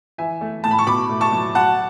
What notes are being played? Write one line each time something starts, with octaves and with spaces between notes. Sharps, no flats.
E3 E5 G#5
A3
A2 A5
B5
C#6
B2 B5 D6
A3
A5 C#6
F#3
F#3 F#5 A5